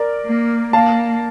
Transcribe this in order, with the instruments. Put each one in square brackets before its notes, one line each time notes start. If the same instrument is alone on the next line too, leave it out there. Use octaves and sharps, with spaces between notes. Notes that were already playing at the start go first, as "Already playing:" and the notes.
Already playing: [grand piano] A#4 D5
[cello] A#3
[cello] A#3 [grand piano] F5 A5